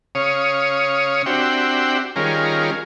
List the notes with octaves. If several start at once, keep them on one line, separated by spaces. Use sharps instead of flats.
C#3 C#5 F5 D#6
C4 D4 F#4 G4 E5 G5
D#3 G3 C#4 F4 G#4 A#4